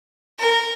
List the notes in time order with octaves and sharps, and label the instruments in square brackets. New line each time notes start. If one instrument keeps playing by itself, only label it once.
[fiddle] A#4